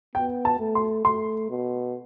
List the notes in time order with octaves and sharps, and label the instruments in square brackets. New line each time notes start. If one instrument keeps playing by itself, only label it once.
[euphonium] B3 [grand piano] G5
[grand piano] A5
[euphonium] A3
[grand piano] C6
[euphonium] A3 [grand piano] C6
[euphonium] B2